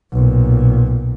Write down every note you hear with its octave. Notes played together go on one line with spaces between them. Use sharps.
B1 A#2